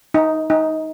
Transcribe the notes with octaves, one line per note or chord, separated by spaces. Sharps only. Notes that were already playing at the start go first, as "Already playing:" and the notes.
D#4
D#4